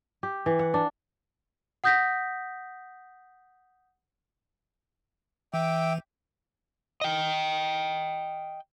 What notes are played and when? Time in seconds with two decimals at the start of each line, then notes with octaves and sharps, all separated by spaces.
0.23 G4
0.46 E3
0.59 F#5
0.74 D4
1.84 F#5 D#6 G6 A#6 B6
5.54 E3 E5 G5 D6
7.01 D#5 G5